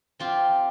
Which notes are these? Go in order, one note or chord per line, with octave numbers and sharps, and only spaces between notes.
C4 F4 G4